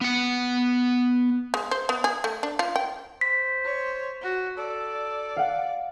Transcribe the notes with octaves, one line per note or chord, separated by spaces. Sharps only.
B3 F#5
G#3
C5
B3
G#4
A3
D4
F4
G5
C5 B6
C#5
F#4
A4 D5
F5 F#5